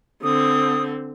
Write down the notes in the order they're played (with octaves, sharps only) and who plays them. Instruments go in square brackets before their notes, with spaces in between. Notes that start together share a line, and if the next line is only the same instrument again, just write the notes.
[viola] D3 C4 [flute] D#6